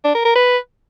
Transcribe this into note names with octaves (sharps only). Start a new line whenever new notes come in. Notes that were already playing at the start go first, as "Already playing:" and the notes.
D4
A#4
A#4
B4